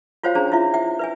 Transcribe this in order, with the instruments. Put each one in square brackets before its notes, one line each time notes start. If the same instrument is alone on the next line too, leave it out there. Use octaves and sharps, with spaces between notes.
[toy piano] F4 F#4 C5 C#5 F5 G5
C#4 D4 G#4 C5 A#5
E4 F4 E5
E5 G5
B4 E5 G#5